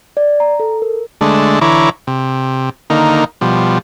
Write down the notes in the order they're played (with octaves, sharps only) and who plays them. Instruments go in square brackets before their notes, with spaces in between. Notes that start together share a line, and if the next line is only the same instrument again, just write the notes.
[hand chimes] D5
A#5
A4
A#4
[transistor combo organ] D3 G#3 A3 D4
D3 E3 E4 C#5 A#5 D6
C3
D3 D#3 A#3 D#4
B2 F3 G3